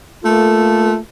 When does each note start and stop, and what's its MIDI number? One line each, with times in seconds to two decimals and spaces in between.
0.23 0.96 57
0.23 0.96 58
0.23 0.96 65
0.23 0.96 69